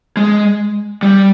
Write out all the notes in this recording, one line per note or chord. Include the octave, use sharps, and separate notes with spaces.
G#3
G3